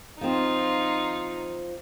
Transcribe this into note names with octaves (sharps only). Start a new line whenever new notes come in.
F3 C4 D#4 F4